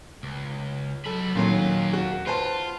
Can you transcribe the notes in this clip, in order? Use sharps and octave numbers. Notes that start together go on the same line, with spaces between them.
C#2
F#3 A4 B5
D#2 A#2 D#3 F#3 F5
F#4
F4 B4 C5 A5